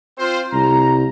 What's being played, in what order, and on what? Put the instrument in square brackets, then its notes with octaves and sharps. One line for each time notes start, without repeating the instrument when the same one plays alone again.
[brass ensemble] C4 F4 C5
[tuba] C2 [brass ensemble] A#5